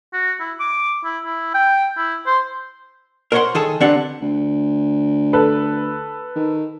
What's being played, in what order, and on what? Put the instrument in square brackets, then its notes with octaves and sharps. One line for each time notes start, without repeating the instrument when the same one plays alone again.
[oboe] F#4
E4
D6
E4
E4
G5
E4
C5
[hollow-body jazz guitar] A#4 C5 C#5 D#5 F#5 C6
D#3 G#4 A4
D3 C4 D4 G4 B4 F#5
[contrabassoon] D2
[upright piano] A4 B4
[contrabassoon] D#3